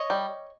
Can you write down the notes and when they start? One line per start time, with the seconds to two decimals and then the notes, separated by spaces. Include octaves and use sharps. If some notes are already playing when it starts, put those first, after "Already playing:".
Already playing: C#5 D#5
0.10 G3